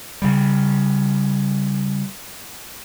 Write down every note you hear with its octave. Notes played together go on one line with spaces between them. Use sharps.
C#3 G3